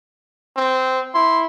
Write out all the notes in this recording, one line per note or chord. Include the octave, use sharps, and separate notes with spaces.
C4
E4 C6